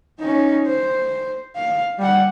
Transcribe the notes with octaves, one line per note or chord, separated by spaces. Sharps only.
C#4 D#4
C5
F5
G3 F#5